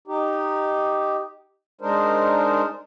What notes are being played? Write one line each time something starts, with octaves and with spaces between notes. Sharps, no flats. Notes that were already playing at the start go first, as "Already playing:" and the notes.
D#4 G4
G#3 D4 D#4 A#4 C5